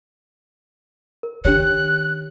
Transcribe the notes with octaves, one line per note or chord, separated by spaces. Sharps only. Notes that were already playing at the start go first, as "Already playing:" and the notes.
A#4
D#3 D4 G4 C#5 F#6